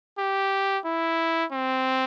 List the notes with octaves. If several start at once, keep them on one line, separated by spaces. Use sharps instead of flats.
G4
E4
C4